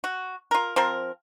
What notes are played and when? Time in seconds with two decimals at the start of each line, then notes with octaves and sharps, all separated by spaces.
0.04 F#4
0.51 F4 A#4
0.76 F3 C4 A#4